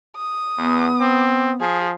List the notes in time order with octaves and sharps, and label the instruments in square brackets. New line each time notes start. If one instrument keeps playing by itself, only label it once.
[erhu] D#6
[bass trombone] E2 [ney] B3
[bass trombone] C4
[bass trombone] F3 [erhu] G#4